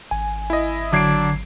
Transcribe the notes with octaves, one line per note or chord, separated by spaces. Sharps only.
G#1 G#5
E4 D#5
D3 F#3 D4 G#6 C7 D7